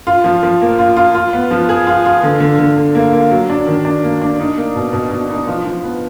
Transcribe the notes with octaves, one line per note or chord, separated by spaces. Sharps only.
F4
F3
F3
A#3
F4
F4
F4
B3
F3
G#4
F4
F4
D3
D3
D3
D3
A#3
A#3
F#3
D4
D#3
D4
A#3
D4
D#4
A#3
B2
B2
B2
D#4
F3
F3
B3